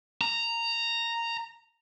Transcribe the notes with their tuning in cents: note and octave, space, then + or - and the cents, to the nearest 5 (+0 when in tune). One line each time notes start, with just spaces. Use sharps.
A#5 -10